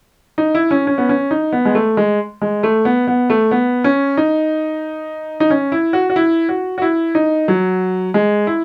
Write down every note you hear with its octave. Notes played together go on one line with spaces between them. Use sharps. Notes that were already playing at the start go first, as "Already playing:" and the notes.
D#4
E4
C#4
C#4
B3
C#4
D#4
B3
G#3
A3
G#3
G#3
A3
B3
B3
A3
B3
C#4
D#4
D#4
C#4
E4
F#4
F#4
E4
F#4
F#4
E4
D#4
F#3
G#3
E4